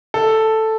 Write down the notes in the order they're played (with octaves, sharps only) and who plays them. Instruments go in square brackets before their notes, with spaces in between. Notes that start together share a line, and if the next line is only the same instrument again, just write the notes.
[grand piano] A4